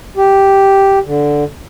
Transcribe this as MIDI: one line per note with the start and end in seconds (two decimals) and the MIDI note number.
0.17 0.99 67
1.05 1.44 50